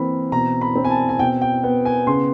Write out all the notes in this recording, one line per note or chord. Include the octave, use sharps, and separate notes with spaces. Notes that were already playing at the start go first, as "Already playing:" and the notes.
Already playing: E3 A#3 C4 B5
B2 A#5
B5
C4
G#5
A5
G#5
B2 G5
G5
B3
G#5
C#3 C6